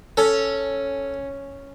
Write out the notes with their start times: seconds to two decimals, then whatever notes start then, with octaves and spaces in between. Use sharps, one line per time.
0.17 C#4 A4